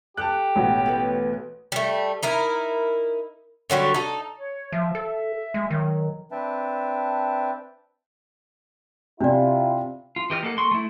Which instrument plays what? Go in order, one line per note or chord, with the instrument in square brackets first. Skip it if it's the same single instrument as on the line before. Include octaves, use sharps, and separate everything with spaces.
[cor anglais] G4 [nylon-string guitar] A4 G5 [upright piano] A5 F#6
[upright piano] A1 B2 F#4
[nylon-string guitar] B3 A4 B4
[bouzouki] G3 A3
D#4 E4 A#4
D3 F#3 G3 F#4
D#4 A4
[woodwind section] C#5
[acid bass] F3 [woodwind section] E5
[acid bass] A4
G#3
[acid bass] D#3 [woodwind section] F#3
[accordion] C4 D4 B4 E5 G5 A5
[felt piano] C3 [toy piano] D4 D5 [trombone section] E4 F4
[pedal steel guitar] F4
E3 G4 D#5 F6
A#3 A4 F#5
A#3 C6 C#6
A3 E4